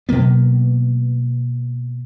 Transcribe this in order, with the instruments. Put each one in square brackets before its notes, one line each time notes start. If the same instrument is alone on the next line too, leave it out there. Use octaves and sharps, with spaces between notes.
[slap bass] B2 F#3 A#3 B3